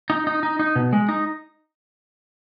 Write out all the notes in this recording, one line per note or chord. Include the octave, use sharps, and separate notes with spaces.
D#4
D#4
D#4
D#4
B2
G#3
D#4